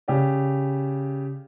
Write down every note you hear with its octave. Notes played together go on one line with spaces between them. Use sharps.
C#3 G4 D5